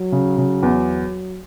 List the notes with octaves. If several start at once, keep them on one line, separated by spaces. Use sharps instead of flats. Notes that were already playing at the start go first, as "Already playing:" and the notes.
Already playing: F#3
C#3
C#3
E2